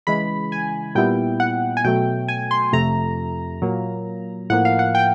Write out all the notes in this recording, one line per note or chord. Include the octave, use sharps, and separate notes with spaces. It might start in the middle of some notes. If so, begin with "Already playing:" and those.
C#3 E3 G#3 B5
G#5
A#2 G3 B3 E4 G5
F#5
G#5
B2 F#3 A3 G5
G#5
C6
F2 C3 F3 A3 A#5
A#2 F#3 A#3
A2 F3 A#3 F#5
F5
F#5
G5